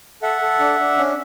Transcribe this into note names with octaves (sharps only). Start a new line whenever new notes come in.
A4 E5 F#5
A4
D4
D4
C#4